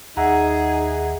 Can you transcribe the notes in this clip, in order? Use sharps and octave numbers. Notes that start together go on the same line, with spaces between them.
D#2 D#4 G#4 E5 F#5 A#5